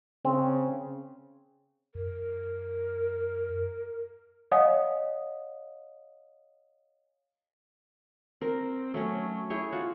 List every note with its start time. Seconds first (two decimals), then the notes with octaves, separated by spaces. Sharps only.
0.25 C#3 C4
1.95 F#2 A#4
4.52 C#5 D#5 F5 F#5 G#5 D#6
8.41 C4 A#4
8.94 F#3 A3 C#4
9.50 E4 G#4 C#5 G5
9.72 F4 F#4